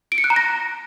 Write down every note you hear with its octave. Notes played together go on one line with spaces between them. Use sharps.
D7
C#7
F#6
A#5
A#6